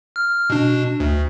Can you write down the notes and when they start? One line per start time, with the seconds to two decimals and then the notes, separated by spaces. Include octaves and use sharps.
0.16 F6
0.50 B2 D4
1.00 D2